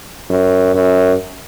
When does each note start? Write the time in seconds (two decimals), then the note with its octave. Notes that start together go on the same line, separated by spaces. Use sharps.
0.30 F#2
0.75 F#2